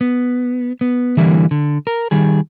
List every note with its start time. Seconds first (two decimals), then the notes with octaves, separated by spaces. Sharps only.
0.01 B3
0.81 B3
1.17 D3 E3 G3 A#3 E4
1.51 D3
1.87 A#4
2.11 D#3 G3 G#4